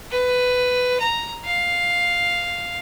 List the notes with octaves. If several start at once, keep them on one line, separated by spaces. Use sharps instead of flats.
B4
A#5
F5